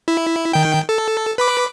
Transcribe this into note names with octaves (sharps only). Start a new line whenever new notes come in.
E4
D#3 G5
A4
B4 B5 D6